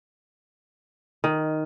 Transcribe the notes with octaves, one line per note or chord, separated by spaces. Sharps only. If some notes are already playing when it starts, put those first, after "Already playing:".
D#3